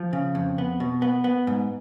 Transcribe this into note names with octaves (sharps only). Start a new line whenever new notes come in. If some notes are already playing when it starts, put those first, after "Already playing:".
Already playing: F3
C#3
F2
B3
B2
B3
B3
G#2